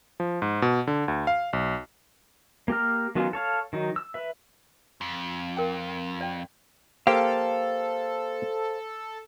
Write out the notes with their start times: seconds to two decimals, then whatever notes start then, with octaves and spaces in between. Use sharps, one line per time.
0.20 F3
0.42 G#2
0.62 B2
0.87 D3
1.08 D2
1.27 F5
1.53 B1
2.68 A#3 G4 A#5 F6
3.15 D#3 F#3 B3 C#4 F4
3.33 A4 C#5 F5
3.73 D#3 F#3 D#4
3.96 E6
4.14 B4 E5
5.01 F2
5.57 A#4 G5
6.21 D5 G5
7.07 A#3 G4 A4 C5 F5